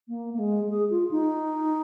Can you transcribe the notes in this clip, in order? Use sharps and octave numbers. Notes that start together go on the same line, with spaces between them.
A#3
A#3
G#3
G#4
F4
D#4